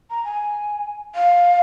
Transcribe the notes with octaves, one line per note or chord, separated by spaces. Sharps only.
A#5
G#5
F5